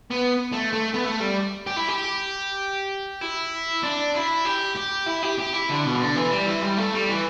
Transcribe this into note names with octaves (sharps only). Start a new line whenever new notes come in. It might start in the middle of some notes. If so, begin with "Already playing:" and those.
B3
A3
A3
B3
A3
G3
G4
E4
G4
E4
D4
E4
G4
G4
E4
G4
G4
E4
D3
B2
E3
D3
E3
G3
E3
G3
A3
G3
E3